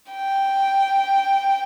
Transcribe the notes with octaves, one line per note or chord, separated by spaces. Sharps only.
G5